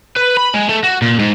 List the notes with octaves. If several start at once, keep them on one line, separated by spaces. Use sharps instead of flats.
B4
B5
G#3
A3
F#4
A#2
G#2